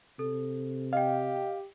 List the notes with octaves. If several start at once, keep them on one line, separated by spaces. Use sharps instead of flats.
C3 A4
G4 D#5 F5 G5